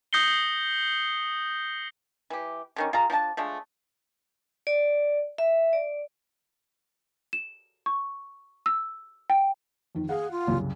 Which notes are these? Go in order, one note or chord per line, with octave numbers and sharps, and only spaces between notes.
D#6 G6 A#6 C7 C#7 G7
E3 G4
D3 D#3 C#4
F4 G#4 F5 A#5
F3 D4 G4 A5
F3 G#3 A3 D4
D5
E5
D5
E7
C#6
E6
G5
F2 D#3
G#4 F5 F#5
F4
C2 F#2 C#3